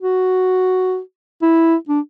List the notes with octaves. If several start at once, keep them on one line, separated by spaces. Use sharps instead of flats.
F#4
E4
D4